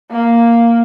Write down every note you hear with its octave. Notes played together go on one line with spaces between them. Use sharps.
A#3